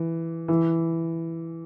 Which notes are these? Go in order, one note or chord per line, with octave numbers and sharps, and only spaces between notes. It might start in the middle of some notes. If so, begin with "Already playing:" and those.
Already playing: E3
E3